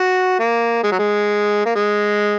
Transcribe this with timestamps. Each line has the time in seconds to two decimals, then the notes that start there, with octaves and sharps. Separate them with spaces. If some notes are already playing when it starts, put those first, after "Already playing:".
Already playing: F#4
0.39 A#3
0.84 G#3
0.92 F#3
0.99 G#3
1.66 A#3
1.76 G#3